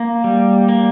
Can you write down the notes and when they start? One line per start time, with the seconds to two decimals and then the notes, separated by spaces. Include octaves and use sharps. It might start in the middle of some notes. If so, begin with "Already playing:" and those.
Already playing: A#3
0.24 G3
0.69 A#3